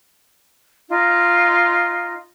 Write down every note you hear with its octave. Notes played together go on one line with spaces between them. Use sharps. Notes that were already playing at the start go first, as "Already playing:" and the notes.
D#4 F4